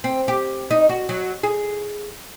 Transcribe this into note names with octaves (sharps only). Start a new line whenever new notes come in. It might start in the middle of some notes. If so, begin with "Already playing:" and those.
C4
G4
D#4
F#4
F#3
G#4